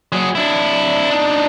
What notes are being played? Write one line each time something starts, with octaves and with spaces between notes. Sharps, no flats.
F#3 G#4
D4 E4
D4 D#4